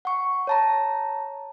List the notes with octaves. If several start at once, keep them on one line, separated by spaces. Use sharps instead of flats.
F#5 C#6
C#5 A5 A#5